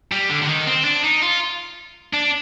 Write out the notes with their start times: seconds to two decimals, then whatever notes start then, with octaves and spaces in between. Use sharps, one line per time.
0.12 G3
0.30 D3
0.42 D3
0.49 D#3
0.67 C4
0.85 D4
1.04 D#4
1.22 F4
2.14 D4